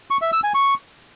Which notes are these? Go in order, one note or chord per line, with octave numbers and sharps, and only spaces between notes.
C#6
E5
E6
G#5
C#6